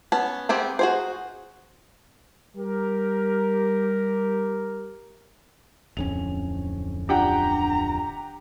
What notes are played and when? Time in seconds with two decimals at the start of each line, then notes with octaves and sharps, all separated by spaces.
0.12 B3 C#4 A5
0.49 B3 C4 G4 G#4
0.79 F#4 G#4 C5
2.56 G3 G4 A#4
5.97 D1 F2 C#4 F7
7.09 D4 F4 G4 F#5 G5 A#5